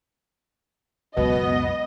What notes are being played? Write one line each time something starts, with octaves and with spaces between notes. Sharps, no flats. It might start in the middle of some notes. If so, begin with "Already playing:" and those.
C#2 F#2 B2 B3 D#5